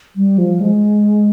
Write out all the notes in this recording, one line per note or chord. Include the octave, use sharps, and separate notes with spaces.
G3
F3
G#3